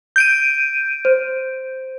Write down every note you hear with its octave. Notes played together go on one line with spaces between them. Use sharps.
G6 D7 D#7
C5